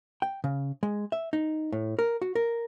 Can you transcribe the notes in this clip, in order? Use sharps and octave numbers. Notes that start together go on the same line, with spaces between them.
G5
C#3
G#3
E5
D#4
A2
A#4
F#4
A#4